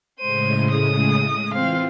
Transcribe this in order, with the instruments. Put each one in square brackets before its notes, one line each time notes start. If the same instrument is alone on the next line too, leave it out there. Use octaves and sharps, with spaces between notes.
[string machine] A2 C#3 G#3 [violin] C5 D#7
[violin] D#6
[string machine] E3 F4 [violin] C4 F5